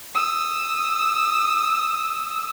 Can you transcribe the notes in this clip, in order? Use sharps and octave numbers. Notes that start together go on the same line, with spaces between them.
D#6 E6